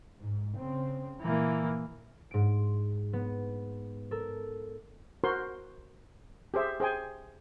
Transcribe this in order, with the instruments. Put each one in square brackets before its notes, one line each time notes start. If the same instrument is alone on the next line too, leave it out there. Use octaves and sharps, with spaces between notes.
[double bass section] G#2
C#3 C4
[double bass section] A#2 [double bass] E3 A#3
[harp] G#2 D7
B3
A4 A#4
[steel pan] F#4 A#4 C5 C6
G4 G#4 C5 E5
G#4 C5 G5 G#5